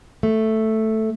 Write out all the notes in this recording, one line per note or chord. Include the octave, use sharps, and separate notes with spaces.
A3